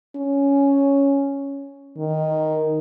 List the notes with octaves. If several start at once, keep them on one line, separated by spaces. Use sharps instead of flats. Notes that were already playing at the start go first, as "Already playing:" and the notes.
C#4
D#3